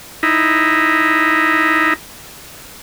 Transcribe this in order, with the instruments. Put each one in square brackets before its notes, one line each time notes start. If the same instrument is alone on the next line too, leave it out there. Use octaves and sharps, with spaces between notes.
[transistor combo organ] D#4 E4